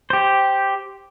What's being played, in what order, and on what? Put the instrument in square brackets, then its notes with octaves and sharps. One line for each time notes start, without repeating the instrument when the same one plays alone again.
[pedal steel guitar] G4 C5